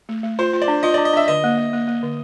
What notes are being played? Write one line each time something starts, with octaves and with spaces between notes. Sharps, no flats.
A3
A3
F4 C5
F4
D5
D4
F4 D#5
D5
D4
D#5
D4 E5
D3 D#5
A#3
A#3
A#3
A#3
D3